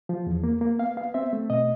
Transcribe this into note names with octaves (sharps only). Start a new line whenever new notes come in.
F3
E2
A#3
A#3
B3 F5
B3 F5
C4 E5
A3
B2 D#5